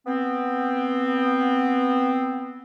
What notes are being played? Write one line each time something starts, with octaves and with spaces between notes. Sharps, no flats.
B3 C4